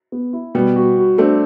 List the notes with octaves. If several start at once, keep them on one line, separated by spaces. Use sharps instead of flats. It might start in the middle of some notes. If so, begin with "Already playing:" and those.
B3
E4
B2 G3 B3
F#4
F#4
A3 C4 D4